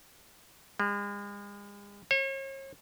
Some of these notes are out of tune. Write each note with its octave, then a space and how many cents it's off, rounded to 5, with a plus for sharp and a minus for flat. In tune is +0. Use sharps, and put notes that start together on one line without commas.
G#3 -40
C#5 -40